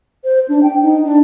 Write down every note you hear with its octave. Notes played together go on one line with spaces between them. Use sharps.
C5
D4
G5
D#4
D4